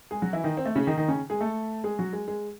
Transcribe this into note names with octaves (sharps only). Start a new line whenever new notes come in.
G#3 G#4
F#3 F#4
E3 E4
D#3 D#4
C4
A3
C#3 C#4
D#3 D#4
D#3 D#4
C#3 C#4
G#3 G#4
A3 A4
G#3 G#4
F#3 F#4
G#3
G#3